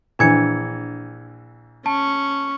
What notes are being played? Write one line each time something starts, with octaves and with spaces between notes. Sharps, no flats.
A#1 E3 D4 G#6 C#7
C#4 A5 C#6